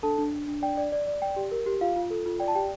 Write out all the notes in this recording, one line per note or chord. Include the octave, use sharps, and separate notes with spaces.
D4 A4 A5
D4
D4
D4
D5 G5
D5
D5
D5
D5 G5
G4
A#4
G4
F4 F5
F4
A4
F4
D5 G5
A5
G4 G5